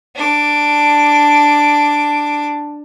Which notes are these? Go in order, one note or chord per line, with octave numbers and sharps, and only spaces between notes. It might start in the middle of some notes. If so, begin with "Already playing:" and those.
D4 D6